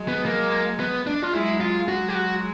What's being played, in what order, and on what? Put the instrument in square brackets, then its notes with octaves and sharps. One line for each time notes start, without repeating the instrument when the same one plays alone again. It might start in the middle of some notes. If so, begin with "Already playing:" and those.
Already playing: [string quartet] F#3 G#3
[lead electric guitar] B3
A#3
B3
D4
F4
[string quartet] F#3 G#3 [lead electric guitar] E4
[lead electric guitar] F4
[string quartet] F#3 G#3 [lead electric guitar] F#4
[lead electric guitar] G4
F#4